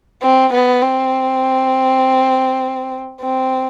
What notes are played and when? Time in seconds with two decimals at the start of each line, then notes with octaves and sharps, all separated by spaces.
0.23 C4
0.53 B3
0.83 C4
3.21 C4